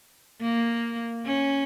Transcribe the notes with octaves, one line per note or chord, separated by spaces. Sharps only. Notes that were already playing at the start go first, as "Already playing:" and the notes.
A#3
C#4